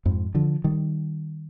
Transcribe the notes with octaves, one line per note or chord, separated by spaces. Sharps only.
F2 G#2
D3 F3
D#3 G3